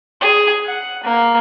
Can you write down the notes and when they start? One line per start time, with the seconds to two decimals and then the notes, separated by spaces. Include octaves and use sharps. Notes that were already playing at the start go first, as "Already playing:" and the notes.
0.21 G#4
0.66 F#5
1.04 A#3